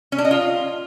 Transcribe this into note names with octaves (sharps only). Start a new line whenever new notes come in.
C#4
D4
D#5
F4